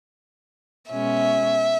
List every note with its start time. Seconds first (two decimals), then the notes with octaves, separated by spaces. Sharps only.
0.92 B2 G#3 C#4 E5